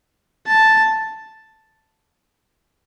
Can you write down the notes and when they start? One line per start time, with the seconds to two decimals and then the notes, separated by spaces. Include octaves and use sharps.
0.47 A5